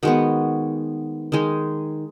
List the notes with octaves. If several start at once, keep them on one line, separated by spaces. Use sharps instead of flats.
D#3 G#3 B3 F#4
D#3 G#3 D#4